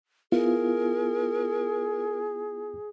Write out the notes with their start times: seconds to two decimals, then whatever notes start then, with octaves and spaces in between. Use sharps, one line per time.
0.32 B3 E4 F4 G#4 A#4